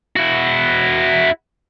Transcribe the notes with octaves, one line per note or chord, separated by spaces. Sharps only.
E4 F#4